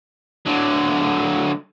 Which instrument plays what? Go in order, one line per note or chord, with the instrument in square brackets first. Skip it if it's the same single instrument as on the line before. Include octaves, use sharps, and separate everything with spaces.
[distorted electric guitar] D3 F#3